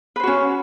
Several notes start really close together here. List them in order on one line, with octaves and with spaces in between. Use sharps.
B4 C5 F#4 C#4